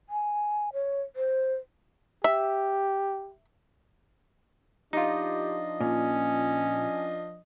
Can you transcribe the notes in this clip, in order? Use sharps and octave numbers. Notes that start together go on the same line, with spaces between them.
G#5
C#5
C5
G4 E5
F3 D4 D#4 F4 G4 D#5
A#2 C#4